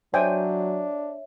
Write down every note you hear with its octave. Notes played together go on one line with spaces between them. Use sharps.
F#3 D4 C5 C#5 E5 G5 G#5